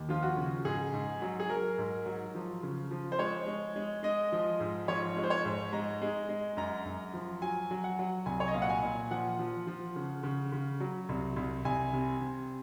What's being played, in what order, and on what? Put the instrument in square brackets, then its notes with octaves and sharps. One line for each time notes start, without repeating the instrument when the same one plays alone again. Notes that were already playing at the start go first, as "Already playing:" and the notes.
Already playing: [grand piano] D#2
F3 F4
F#4
C#3
G#2 G#4
G#2
F#3
G#4
F#3 A#4
G#2
F#3
F3
C#3
F3
C5
G#3 C#5
G#3
G#3
G#3 D#5
F3
G#2
F3 C#5
G#3
C5
C#5
G#2
G#3 A#5
G#3
G#3
F#2 A#5
F#2
F3
F#3 G#5
F#3
F#5
F#3
C2 G#5
C#5
D#5
A#2 F5
F#5
G#5
A#2
F3 F#5
F3
F3
C#3
C#3
C#3
F#3
C2
C2
C2 G#5
C3
C3